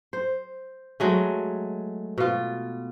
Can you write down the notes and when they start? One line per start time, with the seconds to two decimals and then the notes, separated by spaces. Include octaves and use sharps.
0.13 C5
1.00 F#3 G#3 A3
2.18 B2 F4